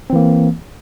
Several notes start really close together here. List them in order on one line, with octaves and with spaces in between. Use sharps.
C4 E3 A#3